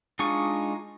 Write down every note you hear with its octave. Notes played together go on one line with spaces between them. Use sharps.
G#3 D4 D#4 F4 C#6